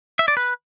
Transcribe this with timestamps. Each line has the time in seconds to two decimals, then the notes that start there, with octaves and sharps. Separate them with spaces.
0.19 E5
0.28 D5
0.37 B4